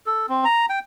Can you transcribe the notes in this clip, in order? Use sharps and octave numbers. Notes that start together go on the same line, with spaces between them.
A4
C4
A#5
G5